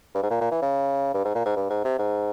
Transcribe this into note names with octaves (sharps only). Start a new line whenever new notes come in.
G2
G#2
A#2
A#2
E3
C#3
G2
G#2
A#2
G#2
G2
G#2
C3
G#2